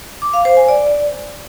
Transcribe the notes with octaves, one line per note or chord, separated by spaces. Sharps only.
D6
F5
C5
G#5
D5